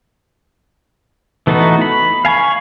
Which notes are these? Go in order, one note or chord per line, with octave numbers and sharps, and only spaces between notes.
E3 A3 B3 D#4 F#4
B5
F5 G#5 A#5 C#6